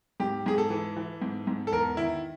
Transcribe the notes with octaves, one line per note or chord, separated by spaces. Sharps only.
G#2 G4
G#2 G#4
A4
E3
E3
G#2
G#2
A4
E2 A#4
D#3 E4